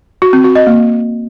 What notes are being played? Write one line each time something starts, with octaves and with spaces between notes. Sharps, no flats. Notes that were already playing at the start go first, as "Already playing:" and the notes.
F#4
C4
F#4
D#5
A#3